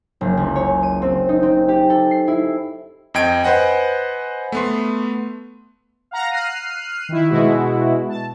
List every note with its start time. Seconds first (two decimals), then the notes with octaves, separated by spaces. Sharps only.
0.21 F#1
0.37 C#2
0.56 C#5
0.83 D#7
1.02 C4
1.29 D#4
1.43 C4
1.68 G4
1.90 A4
2.11 C7
2.28 E4
3.14 F2 D#5 G5 G#6 D7
3.43 B4 C5 D#5 F#5 G#5
4.52 A3 B3 C6
6.11 F5 F#5 A#5 A#6
6.31 F6 F#6 C7 D#7
7.09 D#3 E4
7.30 B2 G#3 E4 F#4
8.09 A5